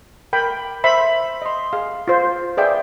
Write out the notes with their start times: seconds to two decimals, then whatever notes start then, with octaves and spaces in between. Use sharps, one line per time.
0.33 A#4 G5 B5
0.84 C5 E5 B5
1.42 D#5 C6
1.73 G#4 F5
2.08 F4 C5
2.57 G#4 B4 D5 E5 F5 G5